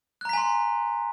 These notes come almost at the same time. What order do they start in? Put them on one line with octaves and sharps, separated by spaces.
F#6 A#5 B6 G#5 C6